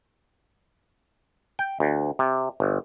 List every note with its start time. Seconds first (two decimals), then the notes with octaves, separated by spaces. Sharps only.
1.59 G5
1.80 D2
2.19 C3
2.60 G1